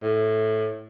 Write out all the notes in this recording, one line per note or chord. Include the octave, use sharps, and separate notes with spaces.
A2